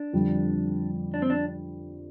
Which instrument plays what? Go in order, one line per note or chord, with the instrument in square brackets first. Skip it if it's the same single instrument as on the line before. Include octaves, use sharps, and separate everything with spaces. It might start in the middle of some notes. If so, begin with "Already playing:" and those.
Already playing: [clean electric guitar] D4
[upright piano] F2 D3 G3
[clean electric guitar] D4
C4
D4